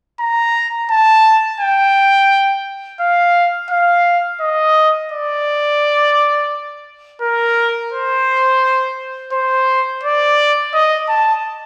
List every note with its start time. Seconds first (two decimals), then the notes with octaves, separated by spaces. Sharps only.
0.20 A#5
0.91 A5
1.60 G5
3.00 F5
3.71 F5
4.41 D#5
5.12 D5
7.22 A#4
7.92 C5
9.33 C5
10.04 D5
10.74 D#5
11.08 A5